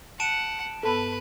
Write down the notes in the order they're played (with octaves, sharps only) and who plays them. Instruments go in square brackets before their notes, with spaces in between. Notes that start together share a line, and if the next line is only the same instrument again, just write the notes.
[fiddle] F#5 [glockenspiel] A5 D7 E7
[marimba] G2 B3 B5 [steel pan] A4 [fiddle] B4